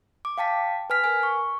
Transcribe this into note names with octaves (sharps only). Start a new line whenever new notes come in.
D6
F5 G5 A5 B6
B4 G#5 F6 B6
A#4 G#5
C#6